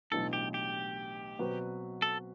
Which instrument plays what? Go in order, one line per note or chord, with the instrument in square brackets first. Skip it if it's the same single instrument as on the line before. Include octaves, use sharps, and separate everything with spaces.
[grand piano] B1 A2 E3 B3 D4 [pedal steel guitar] A4
[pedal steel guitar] G4
G4
[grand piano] B2 F#3 C4 F#4 B4
[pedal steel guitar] A4